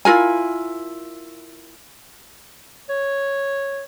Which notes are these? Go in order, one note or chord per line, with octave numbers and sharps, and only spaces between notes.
E4 F4 A#4 G#5
C#5